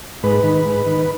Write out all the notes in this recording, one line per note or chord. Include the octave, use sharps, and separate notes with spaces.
G#2 B4
D#3
G#2
D#3